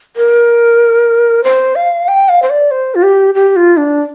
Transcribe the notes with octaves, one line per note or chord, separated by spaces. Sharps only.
A#4
C5
F5
G5
F5
C5
D5
C5
F4
G4
G4
F4
D4